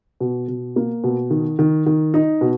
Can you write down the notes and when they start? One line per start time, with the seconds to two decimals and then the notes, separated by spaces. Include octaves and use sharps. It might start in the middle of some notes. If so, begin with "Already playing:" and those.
0.20 B2
0.48 B2
0.76 A#3
1.04 B2
1.30 D#3
1.59 D#3
1.86 D#3
2.14 D#4
2.41 B2